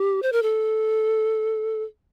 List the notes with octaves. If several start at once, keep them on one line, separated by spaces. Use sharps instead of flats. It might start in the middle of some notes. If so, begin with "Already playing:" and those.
Already playing: G4
C5
A#4
A4